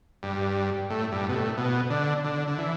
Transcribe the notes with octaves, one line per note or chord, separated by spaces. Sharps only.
G2
A2
G2
B2
A2
B2
D3
D3
D3
E3